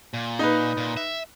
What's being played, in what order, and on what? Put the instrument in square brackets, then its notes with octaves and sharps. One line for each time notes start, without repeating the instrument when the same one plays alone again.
[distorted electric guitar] A#2
[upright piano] D#4 B4
[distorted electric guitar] A#2
E5